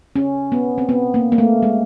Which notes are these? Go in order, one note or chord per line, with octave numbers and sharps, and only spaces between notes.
C#4
B3
C4
B3
A#3
A#3
A3
G#3